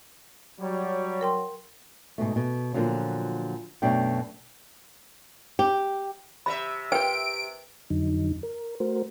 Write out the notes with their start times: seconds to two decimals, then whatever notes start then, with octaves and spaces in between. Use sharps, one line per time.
0.60 F#3 G3 C#5
1.21 A#4 G5 C6
2.18 G#2 B2 A3
2.36 B2
2.74 A#2 D3 F3 F#3
3.82 F#2 B2 F#3 A3 D4 G5
5.59 G4
6.46 C3 D#5 E5 B5
6.92 F4 G4 A#4 B4 G5 D7
7.90 F2 D3 F#3 D#4
8.43 A#4
8.80 A3 F#4 A#4 C5